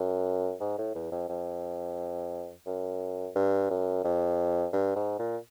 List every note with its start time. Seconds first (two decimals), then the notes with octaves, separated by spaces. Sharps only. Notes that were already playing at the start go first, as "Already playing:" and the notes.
Already playing: F#2
0.60 G#2
0.78 A2
0.95 E2
1.12 F2
1.29 F2
2.66 F#2
3.36 G2
3.70 F#2
4.04 F2
4.73 G2
4.96 G#2
5.19 A#2